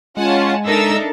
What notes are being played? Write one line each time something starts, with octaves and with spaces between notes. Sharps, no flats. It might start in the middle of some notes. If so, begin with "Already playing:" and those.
G#3 C#4 F4 F#5 G#5 A5
D4 D#4 A4 A#4 E5 E6